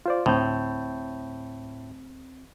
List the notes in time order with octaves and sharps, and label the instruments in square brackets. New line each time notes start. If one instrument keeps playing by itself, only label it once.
[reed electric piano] F4 C5 D5
[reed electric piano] D2 C4 G6 [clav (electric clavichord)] A2